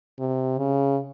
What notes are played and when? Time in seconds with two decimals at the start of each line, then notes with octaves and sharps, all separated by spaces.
0.19 C3
0.58 C#3